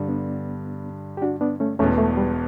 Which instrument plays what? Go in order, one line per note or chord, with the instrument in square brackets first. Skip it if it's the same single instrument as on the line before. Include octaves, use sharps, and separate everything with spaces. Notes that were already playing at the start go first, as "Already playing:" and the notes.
Already playing: [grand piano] G2 D3 G3
[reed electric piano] B3 D4
G4
D4 F#4
B3 D4
A3 C#4
[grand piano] E1 E2 B2 [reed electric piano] A3 C#4
[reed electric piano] A3
G3